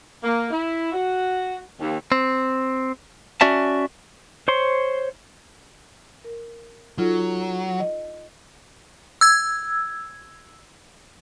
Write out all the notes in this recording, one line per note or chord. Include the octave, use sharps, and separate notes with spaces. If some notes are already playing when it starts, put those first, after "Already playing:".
A#3
E4
F#4
D#2
C4
C#4 F#4 D5 E5 A5
C5 C#5 C6
A#4
F#3 D#4 F4 A4
D#5
E6 G#6